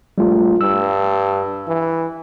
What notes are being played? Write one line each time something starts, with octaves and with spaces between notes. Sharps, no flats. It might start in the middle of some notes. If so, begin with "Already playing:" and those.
A#1 G3 A3 F4
G2 E6
E3